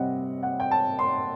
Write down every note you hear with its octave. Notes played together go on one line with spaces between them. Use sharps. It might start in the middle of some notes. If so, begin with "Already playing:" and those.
Already playing: C3 G3 C4 D#5 F#5
F#5
G5
A5
C6